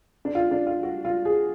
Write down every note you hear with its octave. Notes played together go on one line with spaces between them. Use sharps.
D4
F4
D4
F4
F#4
F4
G#4